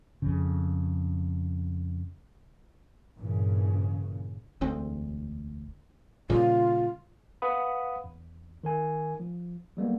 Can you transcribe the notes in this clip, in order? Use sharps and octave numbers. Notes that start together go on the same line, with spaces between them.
F2 C#3
G2 A#2 C#3 E3
E1 D2 C4
A#2 C#3 G3 F4
B4 F5 F#5 B5 D#6
E2
D#3 A#4 G#5
F3
F#3 G3 A#3 B3